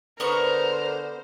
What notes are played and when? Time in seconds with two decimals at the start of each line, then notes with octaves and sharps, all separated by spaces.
0.20 D3 B3 A#4 C5 C#6